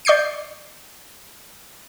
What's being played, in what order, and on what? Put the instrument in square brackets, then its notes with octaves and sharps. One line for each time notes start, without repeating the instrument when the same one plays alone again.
[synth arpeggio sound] D5 C#6 G6 C7 D7